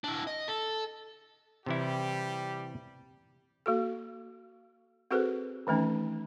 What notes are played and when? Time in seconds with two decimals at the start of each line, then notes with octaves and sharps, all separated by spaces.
0.04 D4 E4
0.27 D#5
0.48 A4
1.66 C3 E3 G3 E4 G4
3.66 A#3 F#4 A4
5.11 C4 F#4 G#4 A4 B4 C5
5.67 D#3 E3 A3 C#4 D#4